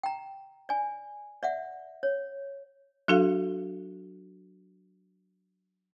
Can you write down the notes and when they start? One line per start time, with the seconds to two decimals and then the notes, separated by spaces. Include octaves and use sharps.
0.03 G5 A#5
0.69 D5 G#5
1.43 D5 E5 F#5
2.03 C#5
3.08 F#3 D4 F#4 A4 F5